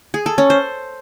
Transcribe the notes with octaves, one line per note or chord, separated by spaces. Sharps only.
G#4
A4
C#4
C5